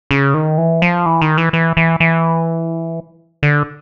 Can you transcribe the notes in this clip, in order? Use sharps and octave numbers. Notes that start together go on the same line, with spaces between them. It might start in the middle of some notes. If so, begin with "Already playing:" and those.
C#3
D#3
E3
F3
E3
D#3
E3
E3
E3
E3
D3